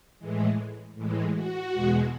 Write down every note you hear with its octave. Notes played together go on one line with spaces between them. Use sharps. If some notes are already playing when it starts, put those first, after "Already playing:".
A2 E3 G#3
A2 E3 G#3
F#4
E2 B2 G#3